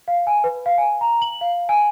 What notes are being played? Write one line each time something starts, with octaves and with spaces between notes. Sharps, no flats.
F5
G#5
B4
F5
G#5
A#5
F#7
F5
G#5